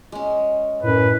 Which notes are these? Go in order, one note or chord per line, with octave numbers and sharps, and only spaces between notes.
G#3 C#4
F#2 A2 B4